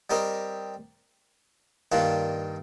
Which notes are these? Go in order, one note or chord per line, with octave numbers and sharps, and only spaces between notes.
G3 C4 G4 A#4 D#5
G2 D#3 A#3 D4 F4